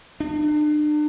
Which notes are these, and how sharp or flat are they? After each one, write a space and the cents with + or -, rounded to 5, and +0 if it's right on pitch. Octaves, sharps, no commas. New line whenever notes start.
D4 +40